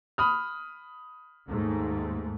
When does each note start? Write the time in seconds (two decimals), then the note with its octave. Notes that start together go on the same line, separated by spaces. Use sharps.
0.18 B5 D#6 F6
1.48 D#2 G#2 A3